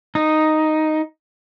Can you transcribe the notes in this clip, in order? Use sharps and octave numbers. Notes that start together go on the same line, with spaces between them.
D#4